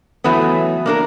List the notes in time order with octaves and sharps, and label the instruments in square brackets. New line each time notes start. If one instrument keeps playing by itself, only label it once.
[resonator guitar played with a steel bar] E3 F#3 A3 B3
A#3 D4 A#4